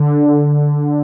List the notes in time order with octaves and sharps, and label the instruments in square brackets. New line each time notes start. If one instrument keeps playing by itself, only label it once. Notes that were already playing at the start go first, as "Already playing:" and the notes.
Already playing: [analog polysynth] D3